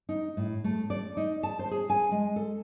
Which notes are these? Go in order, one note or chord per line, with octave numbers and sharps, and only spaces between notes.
D#4
A2
A3
D5
D#4
A5
C5
G#4
G#5
G#3
A4